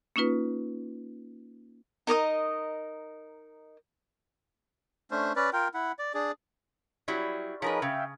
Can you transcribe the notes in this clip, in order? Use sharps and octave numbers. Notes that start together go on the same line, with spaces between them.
A#3 C#4 D#4 F4 B4
D#4 A#4 D#5 D#6
A3 C#4 D4 C5
C#4 B4 D5
F4 A#4 G5
E4 F#5
D5
D4 G#4 D5
F#3 G3 E4
F3 D#4 G#4 A#4 B4 C#5
C#3 E5 F5 G5